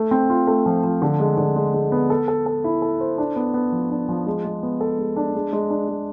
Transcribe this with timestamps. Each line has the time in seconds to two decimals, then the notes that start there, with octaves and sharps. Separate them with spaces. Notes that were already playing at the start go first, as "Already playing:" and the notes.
Already playing: A3
0.11 C4
0.30 F4
0.47 A3
0.66 F3
0.84 F3
1.02 D3
1.20 G#3
1.38 D3
1.56 G#3
1.74 G#3
1.92 B3
2.10 A4
2.28 A4
2.46 A4
2.64 E4
2.82 A4
3.00 C5
3.18 D4
3.36 B3
3.54 B3
3.72 F3
3.90 D4
4.09 F3
4.26 G#3
4.44 G#3
4.63 B3
4.81 A4
4.99 G#3
5.16 D4
5.35 G#3
5.53 G#3
5.70 D4
5.89 G#3